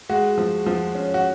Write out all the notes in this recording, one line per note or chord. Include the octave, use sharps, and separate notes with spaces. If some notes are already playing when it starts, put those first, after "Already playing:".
G#3 F#4
F3
F3
C#4
F#4